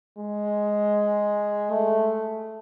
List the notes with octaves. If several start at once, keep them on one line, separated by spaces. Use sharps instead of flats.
G#3
A3